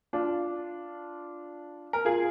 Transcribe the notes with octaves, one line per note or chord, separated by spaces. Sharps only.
D4 F4
A#4
F4 G#4